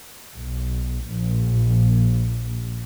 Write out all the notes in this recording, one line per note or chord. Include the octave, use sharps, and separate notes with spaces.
B1
A#1